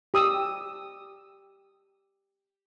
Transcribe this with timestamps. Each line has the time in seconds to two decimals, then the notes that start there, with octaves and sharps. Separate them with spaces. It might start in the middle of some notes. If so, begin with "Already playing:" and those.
0.14 G4 D#6 E6